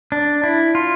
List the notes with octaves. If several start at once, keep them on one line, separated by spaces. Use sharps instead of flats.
D4
E4
F4